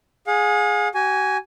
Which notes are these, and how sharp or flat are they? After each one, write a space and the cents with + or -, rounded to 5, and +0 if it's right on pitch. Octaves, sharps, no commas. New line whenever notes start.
G#4 +0 F5 +45
F#4 +45 G#5 +0